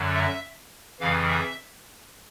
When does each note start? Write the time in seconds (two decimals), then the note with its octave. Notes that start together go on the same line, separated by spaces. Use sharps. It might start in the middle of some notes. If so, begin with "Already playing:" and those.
Already playing: F#2 D3 F#3
0.14 E5
1.00 F2 C#3 E3 F5
1.28 E5